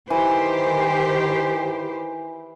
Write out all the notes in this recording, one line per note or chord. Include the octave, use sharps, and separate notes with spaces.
D#3 E3 G4 C5